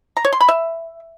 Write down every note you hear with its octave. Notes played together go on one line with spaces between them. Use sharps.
A#5
C#5
C6
B5
E5